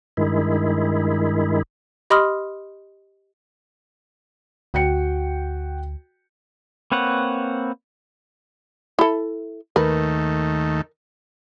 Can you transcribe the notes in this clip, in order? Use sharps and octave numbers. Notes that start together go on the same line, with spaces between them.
G2 D#3 G#3 E4
G4 D#5 B5 C6 D#6 F6
D2 F#4 G5 C#7
A#3 C4 B4 C#5 F#5
E4 A4
D#2 D#3 A3 A#4 B4